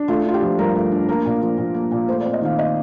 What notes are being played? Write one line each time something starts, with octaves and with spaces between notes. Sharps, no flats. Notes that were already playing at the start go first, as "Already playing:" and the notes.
Already playing: D4
A3 F4
D4 F4
G4
F3
G2 A#4
A3
D4
A#3 A#4
A#2
F3
A#2
A#3
A#2
A3 C5
D5
C4
D#5
D#3 F5
D#5